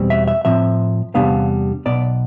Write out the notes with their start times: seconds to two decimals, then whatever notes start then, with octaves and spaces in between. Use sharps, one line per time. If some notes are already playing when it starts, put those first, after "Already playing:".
Already playing: E2 B2 G3 C4
0.10 E5
0.28 E5
0.45 A2 F3 C4 E5
1.15 E2 C3 G3 B3 D4 F5
1.85 B1 B2 B3 D5